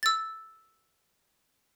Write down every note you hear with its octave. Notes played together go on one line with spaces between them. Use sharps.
E6 A6